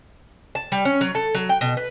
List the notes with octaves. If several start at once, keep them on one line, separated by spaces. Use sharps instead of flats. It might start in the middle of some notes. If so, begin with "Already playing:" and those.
A5
G3
C#4
F#3
A4
F#3
G5
B2
B4